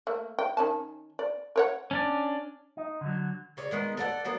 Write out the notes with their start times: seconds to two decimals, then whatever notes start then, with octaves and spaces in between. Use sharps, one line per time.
0.07 A3 A#3
0.39 G5
0.57 D#3 C#4 A5
1.19 D5
1.56 A#4 C#5 F#5
1.91 C#4 D4 D5
2.77 D#4
3.01 D3 F#3
3.57 C#3 C#5 D5
3.71 D#3 G#3 B3
3.97 A4 D5 F5 F#5
4.24 F#3 A#3 B3 D4